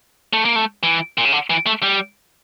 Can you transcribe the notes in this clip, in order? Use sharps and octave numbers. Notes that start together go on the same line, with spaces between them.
A3
A#3
A3
E3
A#2
C#3
D3
E3
A3
G3